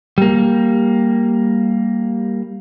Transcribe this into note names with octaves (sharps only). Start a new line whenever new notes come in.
G3 A#3